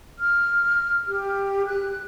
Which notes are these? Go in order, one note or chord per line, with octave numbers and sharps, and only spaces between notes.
F6
G4
F#6